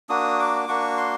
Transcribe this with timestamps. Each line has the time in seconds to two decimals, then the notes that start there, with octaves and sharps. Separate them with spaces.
0.09 A#3 D4 F#4 D#6
0.39 D6
0.68 A#3 D4 F#4 C#6
0.98 C6